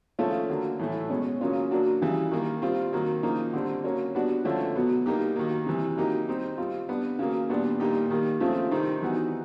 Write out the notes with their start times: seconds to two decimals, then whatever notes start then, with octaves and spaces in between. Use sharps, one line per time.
0.19 C#3 F3 A3 C#4 F4
0.50 D3 F#3 A#3
0.79 A2 E3 A3
1.09 B2 G#3 C#4
1.41 C#3 F#3 A#3 C#4 F4
1.71 F#3 A#3 D4 F#4
2.02 C#3 E3 G3
2.31 D#3 G3 A#3
2.62 G3 C4 F4
2.93 D#3 F#3 A#3
3.23 C#3 F3 A#3 D#4
3.53 D3 G3 C4
3.84 F#3 A#3 C#4
4.15 G3 B3 D4 F#4
4.45 D3 F3 A3 C#4
4.75 B2 F#3 B3
5.06 G3 A#3 D#4 G4
5.36 D#3 F#3 A#3
5.66 C3 E3 G3
5.97 F#3 A#3 D#4 G4
6.28 G3 C4 D#4 G4
6.58 G3 C4 F4
6.89 G3 B3 D4
7.19 C#3 F#3 A#3
7.50 A#2 G3 B3 D4
7.80 A#2 G3 A#3 D#4 G4
8.10 D#3 G3 A#3
8.40 C#3 F3 A3 C4 F4
8.71 C3 D#3 G3 C4 D#4
9.02 E3 G3 B3 D#4 F#4